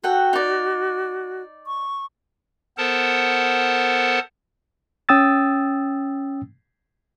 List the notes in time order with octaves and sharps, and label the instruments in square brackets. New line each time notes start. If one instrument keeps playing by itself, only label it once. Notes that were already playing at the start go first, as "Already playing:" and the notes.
[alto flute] F#4 [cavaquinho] A4 F#5 G5
[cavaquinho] D#4 D5
[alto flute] C#6
[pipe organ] B3 A4 A#4 C5 F#5 A5
[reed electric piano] C#4 G5 D#6 E6 A6